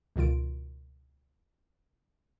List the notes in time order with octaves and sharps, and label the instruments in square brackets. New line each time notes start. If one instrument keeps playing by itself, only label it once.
[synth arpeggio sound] C#2 B2 D#3 F4 D7